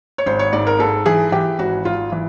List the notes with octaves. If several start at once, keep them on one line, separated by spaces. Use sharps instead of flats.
C#5
G#1 C5
C#5
G#2 D5
A#4
G#2 A4
E3 G#4
E3 G4
G#1 F#4
G#1 F4
E3